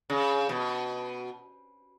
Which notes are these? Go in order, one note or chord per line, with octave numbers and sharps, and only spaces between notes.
C#3
B2